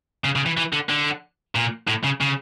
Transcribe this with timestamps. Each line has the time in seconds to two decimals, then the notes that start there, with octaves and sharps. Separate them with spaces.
0.24 C#3
0.36 C#3
0.46 E3
0.58 E3
0.73 D3
0.89 D3
1.56 A#2
1.88 A2
2.04 C#3
2.21 C#3